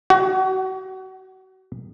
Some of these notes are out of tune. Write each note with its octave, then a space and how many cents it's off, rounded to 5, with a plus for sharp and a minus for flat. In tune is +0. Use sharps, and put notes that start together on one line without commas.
F#4 +30